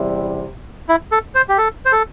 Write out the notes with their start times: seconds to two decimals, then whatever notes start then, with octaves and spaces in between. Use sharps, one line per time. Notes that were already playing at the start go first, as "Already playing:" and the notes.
Already playing: E2 C3 G3 E4
0.89 E4
1.12 A4
1.35 C5
1.49 G4
1.58 A4
1.86 C5
1.92 A4